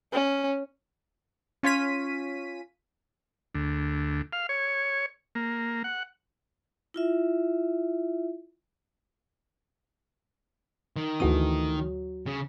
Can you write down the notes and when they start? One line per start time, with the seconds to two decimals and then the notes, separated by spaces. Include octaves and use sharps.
0.12 C#4
1.63 C#4 F4 C#5 B6 D#7
3.54 D2
4.33 F5
4.49 C#5
5.35 A#3
5.84 F#5
6.94 E4 F4 E5
10.96 D#3
11.20 D2 D3 E3 A3 F#4 D#6
11.77 F#3
12.26 C#3